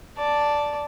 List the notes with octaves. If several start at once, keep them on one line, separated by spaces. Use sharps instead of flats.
D5 A5